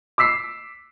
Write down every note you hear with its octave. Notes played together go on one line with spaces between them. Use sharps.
D6 E6 B6 C7